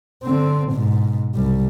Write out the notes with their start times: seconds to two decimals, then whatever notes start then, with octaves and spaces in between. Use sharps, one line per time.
0.23 D3 C4
0.73 G#2 B2
1.35 C2 G3